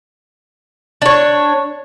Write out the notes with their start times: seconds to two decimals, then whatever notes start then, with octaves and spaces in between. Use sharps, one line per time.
1.02 D4 C#5